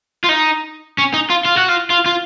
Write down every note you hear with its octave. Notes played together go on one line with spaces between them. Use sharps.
F4
D#4
C#4
D#4
F4
F4
F#4
F4
F4
F4